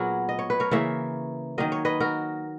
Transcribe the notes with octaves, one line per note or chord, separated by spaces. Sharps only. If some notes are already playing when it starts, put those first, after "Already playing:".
Already playing: A#2 F#3 B3 F#4 G#4 A#4
D#5
C#5
B4
A#4 C#5
C#3 E3 A#3 C#5 E5
D#3 F#3 A#3 D#5
C#5
B4 D#5
F#4 A#4